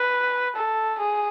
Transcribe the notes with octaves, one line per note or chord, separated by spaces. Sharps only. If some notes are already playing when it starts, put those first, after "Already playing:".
Already playing: B4
A4
G#4